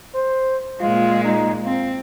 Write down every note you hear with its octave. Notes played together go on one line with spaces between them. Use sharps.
C5
A#2 G#3 F4
D#4
C4 F4